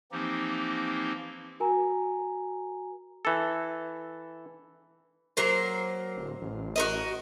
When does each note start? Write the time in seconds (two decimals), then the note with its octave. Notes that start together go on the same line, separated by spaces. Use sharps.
0.12 E3 F3 A#3 C4 D#4 G4
1.60 F#4 A#4 G#5 A#5
3.25 E3 A4
5.37 F#3 A#3 C5
6.17 D1
6.42 A1
6.76 F#4 A#4 D#5